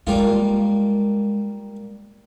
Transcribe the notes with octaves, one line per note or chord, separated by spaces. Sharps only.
G3 G#3 A#3 F4